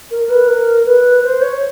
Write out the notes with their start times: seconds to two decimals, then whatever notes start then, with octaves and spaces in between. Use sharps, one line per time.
0.11 A#4
0.29 B4
0.48 A#4
0.86 B4
1.24 C5
1.41 C#5